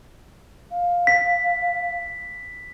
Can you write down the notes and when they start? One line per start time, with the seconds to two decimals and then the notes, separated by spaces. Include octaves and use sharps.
0.70 F5
1.07 B6